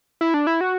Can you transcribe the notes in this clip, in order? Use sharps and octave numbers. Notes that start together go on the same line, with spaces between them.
E4
D4
E4
F#4